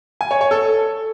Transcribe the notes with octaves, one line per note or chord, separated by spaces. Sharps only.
G#5
C#5
C#5
A4